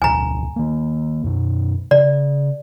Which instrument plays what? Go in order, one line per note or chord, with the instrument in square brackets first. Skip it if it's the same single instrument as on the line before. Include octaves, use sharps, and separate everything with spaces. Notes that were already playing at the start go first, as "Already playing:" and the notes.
[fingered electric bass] D1 B1 [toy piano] G#5 A#5
[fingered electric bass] D#3 A#3
F#2 B2
[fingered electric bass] C#3 [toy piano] D5